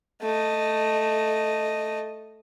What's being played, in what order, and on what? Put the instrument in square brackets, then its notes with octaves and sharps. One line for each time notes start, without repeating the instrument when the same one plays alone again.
[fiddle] A3 D#5